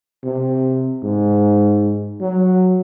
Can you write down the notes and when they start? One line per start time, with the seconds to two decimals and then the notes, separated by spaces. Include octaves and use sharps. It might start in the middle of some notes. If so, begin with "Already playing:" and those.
0.24 C3
1.03 G#2
2.21 F#3